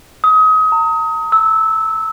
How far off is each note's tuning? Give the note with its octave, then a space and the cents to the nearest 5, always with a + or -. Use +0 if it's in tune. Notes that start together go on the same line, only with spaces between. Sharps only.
D#6 +30
A#5 -35
E6 -15